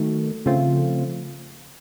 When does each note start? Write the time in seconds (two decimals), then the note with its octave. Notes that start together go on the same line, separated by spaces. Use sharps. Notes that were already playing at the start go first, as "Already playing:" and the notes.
Already playing: D#3 F#3 A3
0.46 C#3 F3 A3 C4 F4